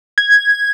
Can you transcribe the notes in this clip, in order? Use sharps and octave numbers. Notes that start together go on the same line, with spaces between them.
G#6